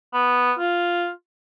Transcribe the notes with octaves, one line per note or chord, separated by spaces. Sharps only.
B3
F4